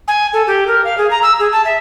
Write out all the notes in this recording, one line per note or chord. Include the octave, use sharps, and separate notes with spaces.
G#5
A4
G4
A#4
F5
G#4
A#5
E6
G#4
A5
E5